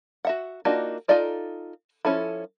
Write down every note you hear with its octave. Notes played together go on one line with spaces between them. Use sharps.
F#4 E5 F#5
A#3 D4 D#4 F4 F#4
D#4 F4 A4 D5 D#5
F3 C#4 E4 A4 B5